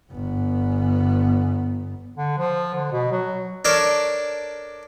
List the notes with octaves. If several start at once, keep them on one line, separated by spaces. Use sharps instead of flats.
G1 B3
D3
F3
D3
B2
F#3
D4 A4 A#4 C#5 D5